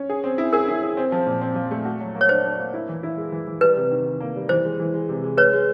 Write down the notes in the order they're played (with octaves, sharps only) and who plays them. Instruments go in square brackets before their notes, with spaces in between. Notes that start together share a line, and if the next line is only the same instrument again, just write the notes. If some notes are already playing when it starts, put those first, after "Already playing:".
Already playing: [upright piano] C#4
G#4
C4
E4
[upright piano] G#4 [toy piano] A#4
[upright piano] E4
G#4
C4
F3
A#2
C4
F3
A3
F#4
F#3
A#3
[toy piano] C#5
[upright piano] D4 [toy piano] C5
[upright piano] D4
A#3
E4
E3
E4
G#3
E3
E3
[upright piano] G3 [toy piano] B4
[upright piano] C3
D#3
D#3
A#3
G3
[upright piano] E3 [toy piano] C5
[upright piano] G#3
E3
G#3
C3
G#3
[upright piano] G#3 [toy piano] B4 C#5
[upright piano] G#3